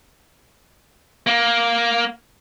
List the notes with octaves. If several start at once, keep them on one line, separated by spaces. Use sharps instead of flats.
A#3